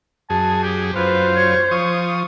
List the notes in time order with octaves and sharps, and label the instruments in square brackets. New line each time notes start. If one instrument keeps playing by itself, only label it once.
[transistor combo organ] F#2 G#4 [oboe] A5
[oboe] G4
[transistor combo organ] F#2 F4 [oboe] B4 [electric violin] C5
[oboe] C#5
[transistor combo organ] F3 D#6 [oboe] C#6